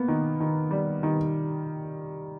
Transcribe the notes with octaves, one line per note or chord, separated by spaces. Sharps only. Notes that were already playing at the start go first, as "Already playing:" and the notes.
Already playing: A#3 B3
D#3
D#3
G3
D#3